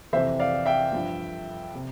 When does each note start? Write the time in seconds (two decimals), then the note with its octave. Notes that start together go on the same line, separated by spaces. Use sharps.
0.13 F2 C3 E3 C5 E5
0.39 D5 F5
0.66 E5 G5
0.92 G2 F3
1.75 C3